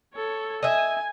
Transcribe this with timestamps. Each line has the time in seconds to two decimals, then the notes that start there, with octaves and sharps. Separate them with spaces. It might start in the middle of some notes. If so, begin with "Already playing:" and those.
0.15 A4 C#5
0.63 D#5 E5 G#5